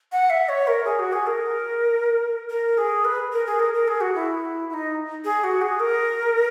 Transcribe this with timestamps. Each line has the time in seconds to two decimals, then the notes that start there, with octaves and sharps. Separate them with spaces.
0.12 F#5
0.30 E5
0.49 C#5
0.67 A#4
0.85 G#4
0.99 F#4
1.13 G#4
1.27 A#4
2.50 A#4
2.78 G#4
3.05 B4
3.32 A#4
3.46 G#4
3.59 A#4
3.74 A#4
3.88 G#4
4.01 F#4
4.15 E4
4.70 E4
4.73 D#4
5.24 G#4
5.44 F#4
5.61 G#4
5.80 A#4